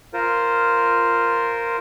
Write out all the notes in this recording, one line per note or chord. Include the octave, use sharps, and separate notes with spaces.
F4 A#4 C5